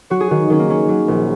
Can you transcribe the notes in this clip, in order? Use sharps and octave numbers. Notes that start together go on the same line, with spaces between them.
F#3 F#4
G#4
D#3 F#4
D#3 C#4
A#3
F#3 C#4
F#3
A#1